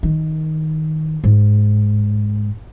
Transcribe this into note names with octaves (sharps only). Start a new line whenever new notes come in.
D#3
G#2